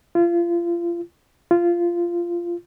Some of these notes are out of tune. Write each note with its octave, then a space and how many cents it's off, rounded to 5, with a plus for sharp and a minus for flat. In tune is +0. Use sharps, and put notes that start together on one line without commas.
F4 -30
F4 -15